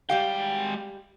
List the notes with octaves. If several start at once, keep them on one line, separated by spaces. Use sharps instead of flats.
G3 G#3 G4 F5 G5